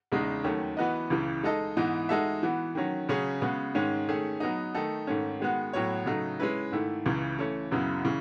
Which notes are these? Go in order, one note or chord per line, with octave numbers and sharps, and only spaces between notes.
E2 C#3 G#3 D#4
D#2 D#3 F#3 A3 C#4
E3 B3 F#4 B4 D#5
C#2 C#3 E3
G#3 D#4 A4 D#5
G#2 E3 B3 D#4
G#3 D#4 F#4 A4 E5
E3 B3 F#4
D#3 F#3 C#4
C#3 F#3 C#4 G#4
C#3 G#3 B3 F#4
G#2 D#3 G#3 C#4
D#3 A3 C#4 G#4
F#3 B3 D#4
D#3 A3 D#4 A4
G#2 D#3 A3 C#4
D#3 G#3 B3 F#4
A2 F#3 B3 F#4 C#5
C#3 F#3 A3 D#4
G#3 C#4 E4 B4
G#2 D#3 A3 E4
C#2 C#3 E3
E3 A3 C#4
F#2 C#3 F#3 B3 E4
C#3 E3